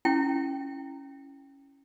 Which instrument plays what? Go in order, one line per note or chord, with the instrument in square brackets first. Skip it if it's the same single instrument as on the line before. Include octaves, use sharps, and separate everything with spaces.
[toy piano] C#4 E4 G5